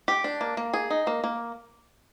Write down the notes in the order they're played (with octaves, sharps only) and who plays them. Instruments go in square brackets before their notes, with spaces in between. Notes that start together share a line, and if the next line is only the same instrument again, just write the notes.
[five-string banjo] G4
D4
A#3
A#3
G#4
D#4
A#3
A#3